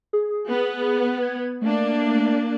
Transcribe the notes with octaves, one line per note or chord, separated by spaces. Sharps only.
G#4
B3
G#6
A3 A#3 D4